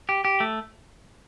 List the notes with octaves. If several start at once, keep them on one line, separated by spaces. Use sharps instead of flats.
G4
G4
A3